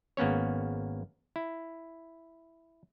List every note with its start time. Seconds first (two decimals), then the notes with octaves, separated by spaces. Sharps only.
0.17 G#1 A#3 B3 C#4 C#5
1.36 E4